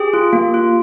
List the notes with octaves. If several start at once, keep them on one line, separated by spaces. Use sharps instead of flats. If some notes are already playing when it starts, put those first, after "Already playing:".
Already playing: G4 G#4 G5
F4
A#3
F4